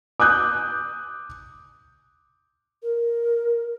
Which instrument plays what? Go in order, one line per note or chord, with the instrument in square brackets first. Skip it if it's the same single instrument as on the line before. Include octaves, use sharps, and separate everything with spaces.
[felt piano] D6 D#6 F#6 G6
[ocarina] A#4